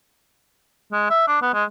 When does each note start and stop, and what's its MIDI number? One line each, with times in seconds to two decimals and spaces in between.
0.92 1.07 56
1.10 1.25 76
1.28 1.39 62
1.42 1.53 59
1.54 1.64 56